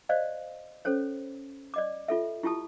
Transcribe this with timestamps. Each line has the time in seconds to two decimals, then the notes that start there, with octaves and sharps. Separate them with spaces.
0.09 C5 D5 D#5 F5
0.85 C#4 A4 C5 C#5
1.74 D5 D#5 D6
2.08 F4 A4 E5
2.43 E4 F4 G4 A5 D#6